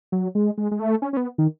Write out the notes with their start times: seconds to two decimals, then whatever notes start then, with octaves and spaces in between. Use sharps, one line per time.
0.12 F#3
0.35 G#3
0.58 G#3
0.71 G#3
0.80 A3
1.02 C#4
1.13 C#4
1.17 B3
1.38 D#3